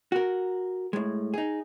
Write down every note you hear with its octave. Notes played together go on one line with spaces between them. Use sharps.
F#4 A#4
A2 G#3
D#4 G#4